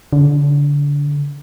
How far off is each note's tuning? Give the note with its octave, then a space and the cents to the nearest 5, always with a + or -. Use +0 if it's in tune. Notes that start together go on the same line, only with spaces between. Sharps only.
D3 -30